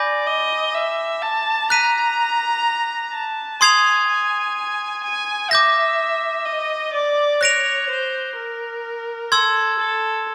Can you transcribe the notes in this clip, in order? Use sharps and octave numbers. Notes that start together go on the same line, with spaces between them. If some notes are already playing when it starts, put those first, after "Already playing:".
Already playing: D5 G#5 B5 D6 G6 A#6
D#5
E5
A5
A#5 F#6 B6 D#7
A5
G#5 C6 D#6 G#6 C7 F7
G#5
G#5
E5 D6 G6 A#6
D#5
D5
C#5 F#6 A#6 D7 F7
C5
A#4
A4 C6 E6 G#6
A4